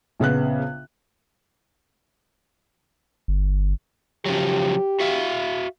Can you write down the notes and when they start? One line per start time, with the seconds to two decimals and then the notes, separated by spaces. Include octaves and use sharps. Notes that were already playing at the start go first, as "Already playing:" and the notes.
0.19 A#1 C#3 B3 F#6
3.28 G1
4.26 C#3 F3 F#3 G4
5.00 F#4 E5 F5